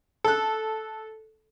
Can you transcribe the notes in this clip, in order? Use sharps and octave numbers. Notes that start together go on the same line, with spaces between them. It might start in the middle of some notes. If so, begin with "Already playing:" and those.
A4 F#6